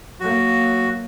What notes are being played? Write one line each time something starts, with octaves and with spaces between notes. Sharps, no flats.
F#3 A#3 F#4